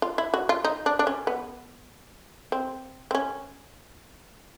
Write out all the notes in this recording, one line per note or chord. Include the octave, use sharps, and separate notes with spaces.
F4
E4
F#4
F4
D#4
D4
D4
C#4
B3
C4
C4
C#4